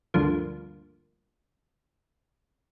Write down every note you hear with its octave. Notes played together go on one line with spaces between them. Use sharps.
D2 G2 D3 F3 A#3